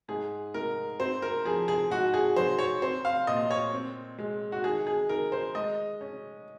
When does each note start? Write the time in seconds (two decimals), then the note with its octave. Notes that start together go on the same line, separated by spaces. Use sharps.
0.08 G#2 G#4
0.54 G#2 A#4
1.00 C4 C5
1.22 A#4
1.45 F3 G#4
1.68 G#4
1.90 G#2 F#4
2.14 G#4
2.36 F#3 C5
2.59 C#5
2.82 C4 C5
3.05 F5
3.27 A#2 D#5
3.51 C#5
3.73 C4
4.18 G#3
4.52 F#4
4.64 D#3 G#4
4.87 G#4
5.09 D#3 A#4
5.32 C5
5.55 G#3 D#5
6.01 C#4